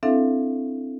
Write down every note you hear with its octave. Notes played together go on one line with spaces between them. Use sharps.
C4 D4 E4 A4 E5 F5